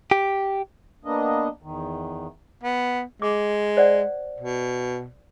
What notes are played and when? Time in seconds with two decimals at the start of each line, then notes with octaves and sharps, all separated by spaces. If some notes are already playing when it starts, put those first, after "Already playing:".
0.11 G4
1.05 A#3 B3 D4 D#5
1.62 E2 D#3
2.63 B3
3.22 G#3 D6
3.77 C5 D5 F#5
4.40 B2